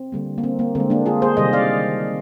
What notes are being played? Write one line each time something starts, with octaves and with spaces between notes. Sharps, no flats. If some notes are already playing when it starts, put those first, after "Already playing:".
Already playing: C4
D3 G3 A#3
A#3
C4
A#3
D3 G#3 C4
A#3 D4
F4 G#4
G#4 C5
C3 D#3 G3 C5 D#5
D5 F5